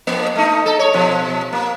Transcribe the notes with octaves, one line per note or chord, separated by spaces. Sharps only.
F2 A#3
A3 D#4
A4
C#5
B2 F3
A#3